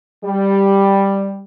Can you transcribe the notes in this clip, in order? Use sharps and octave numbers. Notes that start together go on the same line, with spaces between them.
G3